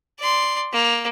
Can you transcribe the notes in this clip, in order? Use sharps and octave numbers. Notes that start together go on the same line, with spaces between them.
D5 C6
A#3